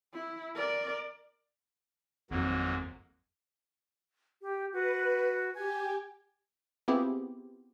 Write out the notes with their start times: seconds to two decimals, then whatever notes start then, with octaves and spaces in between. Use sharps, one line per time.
0.13 E4
0.55 A#4 D5
2.30 G#1 F2 G#2 F#3 A#3
4.42 G4
4.73 F#4 B4
5.55 G4 G#5
6.88 B3 C4 E4 F4 G4 G#4